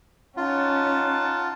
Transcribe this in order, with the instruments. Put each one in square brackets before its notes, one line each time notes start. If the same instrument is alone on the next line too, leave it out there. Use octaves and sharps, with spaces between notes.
[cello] C#4 [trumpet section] D#4 F#5 A5 [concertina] F4